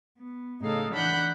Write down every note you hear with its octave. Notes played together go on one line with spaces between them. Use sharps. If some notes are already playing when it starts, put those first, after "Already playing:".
B3
A2 C#3 D#4 A4 F5
E3 D4 F#5 B5 F#6 G6